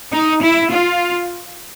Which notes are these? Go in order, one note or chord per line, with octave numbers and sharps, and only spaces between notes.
D#4
E4
F4